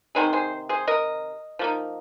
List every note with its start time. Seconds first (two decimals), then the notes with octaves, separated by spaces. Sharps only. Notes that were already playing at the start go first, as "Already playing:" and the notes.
0.15 C3 D#3 C4 D#4 G#4 C5
0.33 G#4 C5
0.69 G#4 C5
0.87 A#4 D#5
1.59 F3 A#3 D#4